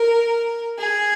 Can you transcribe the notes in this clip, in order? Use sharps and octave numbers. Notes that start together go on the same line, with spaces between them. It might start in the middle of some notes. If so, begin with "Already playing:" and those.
Already playing: A#4
G#4